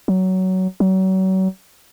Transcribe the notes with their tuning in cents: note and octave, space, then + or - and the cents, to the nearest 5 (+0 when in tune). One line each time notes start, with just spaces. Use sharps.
F#3 +15
F#3 +35